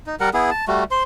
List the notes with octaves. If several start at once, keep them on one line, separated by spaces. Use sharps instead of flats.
D#4
G3 A#4 F#5
B3 E4 G#4
A5
G3 A3 F#4
C5 C6